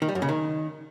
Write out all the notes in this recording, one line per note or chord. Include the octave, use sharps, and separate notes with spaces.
D#3
G3
F#2
C#3
D#3